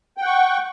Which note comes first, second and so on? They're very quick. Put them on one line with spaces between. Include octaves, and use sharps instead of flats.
G5 F#5 C#6